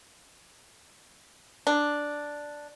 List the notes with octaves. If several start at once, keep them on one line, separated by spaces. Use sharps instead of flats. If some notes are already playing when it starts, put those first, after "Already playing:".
D4